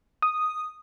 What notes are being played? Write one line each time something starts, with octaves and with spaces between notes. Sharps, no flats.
D#6